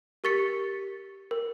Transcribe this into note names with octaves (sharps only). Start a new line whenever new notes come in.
G4 A#4 C#6 A6 B6 C#7
A#4